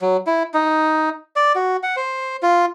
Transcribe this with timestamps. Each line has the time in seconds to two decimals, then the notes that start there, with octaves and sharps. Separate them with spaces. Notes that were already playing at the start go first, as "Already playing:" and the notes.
0.02 F#3
0.27 E4
0.54 D#4
1.36 D5
1.55 F#4
1.83 F#5
1.96 C5
2.43 F4